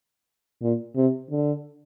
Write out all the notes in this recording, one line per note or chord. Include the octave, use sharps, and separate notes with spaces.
A#2
C3
D3